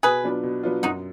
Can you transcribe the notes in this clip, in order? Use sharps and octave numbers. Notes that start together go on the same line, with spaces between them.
B2 G#4 B4
F#3 B3 D4 F4
B2
F#3 B3 D4 F4
F#2 D#4 F#4